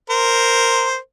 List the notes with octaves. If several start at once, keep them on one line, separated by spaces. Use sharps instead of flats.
A#4 C5